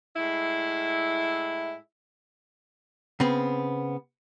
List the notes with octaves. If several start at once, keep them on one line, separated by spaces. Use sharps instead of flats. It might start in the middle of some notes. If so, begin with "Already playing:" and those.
A2 G#3 E4
C#3 B3 C4